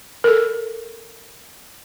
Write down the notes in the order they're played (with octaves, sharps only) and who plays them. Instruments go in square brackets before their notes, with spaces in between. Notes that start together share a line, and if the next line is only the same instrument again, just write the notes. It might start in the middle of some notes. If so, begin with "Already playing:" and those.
[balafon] A4 A#4